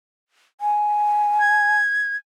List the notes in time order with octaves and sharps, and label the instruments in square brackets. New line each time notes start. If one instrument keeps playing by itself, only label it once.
[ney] G#5
[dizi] G#6